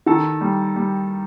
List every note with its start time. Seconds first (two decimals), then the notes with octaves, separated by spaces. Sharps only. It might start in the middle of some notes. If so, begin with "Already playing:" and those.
0.06 D#3 A4
0.41 G3
0.76 G3